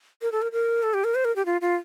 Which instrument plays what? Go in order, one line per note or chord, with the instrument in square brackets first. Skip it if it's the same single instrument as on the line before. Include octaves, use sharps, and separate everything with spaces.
[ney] A#4
A4
A#4
A#4
A4
G4
A#4
C5
A#4
G4
F4
F4